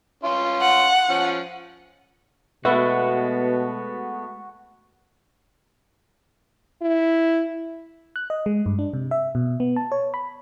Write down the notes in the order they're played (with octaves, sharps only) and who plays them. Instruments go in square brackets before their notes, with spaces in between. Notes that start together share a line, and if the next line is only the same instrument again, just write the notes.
[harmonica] C#4 F4 C6
[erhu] F#5
[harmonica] F3 C#4
[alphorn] B2 [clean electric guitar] G#3 A3 B3 [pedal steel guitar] F#4 [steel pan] B4 E5
[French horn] E4
[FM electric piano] F#6
D#5
G#3
G2
D4
C3
E5
B2
B3
A5
C#5
B5